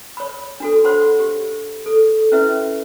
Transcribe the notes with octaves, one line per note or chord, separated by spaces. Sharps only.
C#5 B5
D4 F#4 A4
C5 C#5 F#5 B5 C6
G4
A4
C#4 E4 F#4 B4 E5